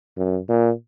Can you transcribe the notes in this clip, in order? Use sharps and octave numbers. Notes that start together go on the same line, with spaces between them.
F#2
A#2